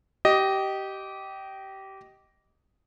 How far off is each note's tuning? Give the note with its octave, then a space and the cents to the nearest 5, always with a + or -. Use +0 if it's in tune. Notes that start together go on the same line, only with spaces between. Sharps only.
G4 -20 D#5 +0